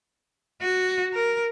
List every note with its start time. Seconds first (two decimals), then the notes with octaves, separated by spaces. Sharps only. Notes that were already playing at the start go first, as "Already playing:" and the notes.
0.62 F#4
1.13 A#4